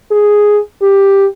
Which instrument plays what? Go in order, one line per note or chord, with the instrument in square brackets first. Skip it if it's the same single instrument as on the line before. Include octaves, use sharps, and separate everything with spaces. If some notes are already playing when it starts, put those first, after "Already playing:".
[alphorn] G#4
G4